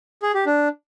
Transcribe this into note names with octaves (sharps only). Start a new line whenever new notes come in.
G#4
G4
D4